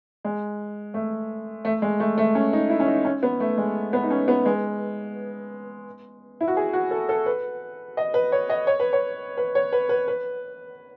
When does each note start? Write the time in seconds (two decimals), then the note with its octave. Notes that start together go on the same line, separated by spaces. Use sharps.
0.25 G#3
0.94 A3
1.65 A3
1.82 G#3
2.00 A3
2.18 A3
2.35 C#4
2.53 D#4
2.70 E4
2.80 C#4
2.88 D#4
3.05 C#4
3.23 B3
3.40 A3
3.57 G#3
3.93 B3
4.03 D#4
4.11 C#4
4.28 B3
4.46 G#3
6.41 E4
6.48 F#4
6.57 G#4
6.73 F#4
6.91 A4
7.09 A4
7.26 B4
7.97 D#5
8.14 B4
8.32 C#5
8.50 D#5
8.67 C#5
8.80 B4
8.93 C#5
9.37 B4
9.55 C#5
9.73 B4
9.89 B4
10.08 B4